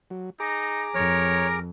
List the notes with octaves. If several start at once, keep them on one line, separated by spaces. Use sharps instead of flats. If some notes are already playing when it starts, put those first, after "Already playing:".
F#3
D#4 G#4 A#5 D6
F2 A#4 C#5